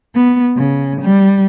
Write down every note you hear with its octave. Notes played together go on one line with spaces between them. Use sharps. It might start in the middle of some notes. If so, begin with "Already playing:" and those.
B3
C#3
G3